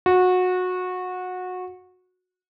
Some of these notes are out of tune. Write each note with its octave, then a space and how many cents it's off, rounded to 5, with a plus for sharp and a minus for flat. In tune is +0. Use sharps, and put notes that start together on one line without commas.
F#4 -20